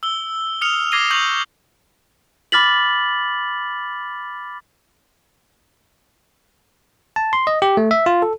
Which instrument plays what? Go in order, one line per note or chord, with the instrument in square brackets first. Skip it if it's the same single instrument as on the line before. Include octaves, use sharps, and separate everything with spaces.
[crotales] E6 G7
D#6 F6 C#7 F7 G7
D6 G#6 A#6 C7 D#7 G7
C#6 G6 A#6 F7 F#7
[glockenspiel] B5 D6 F6 A6 B6 F#7
[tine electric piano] A5
C6
D#5
G4
A3
E5
F4
A4